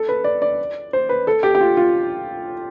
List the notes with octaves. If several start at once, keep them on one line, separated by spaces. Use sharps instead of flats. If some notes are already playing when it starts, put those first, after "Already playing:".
Already playing: A4
B4
D5
D5
C5
B4
A4
G4
G4
F4
F4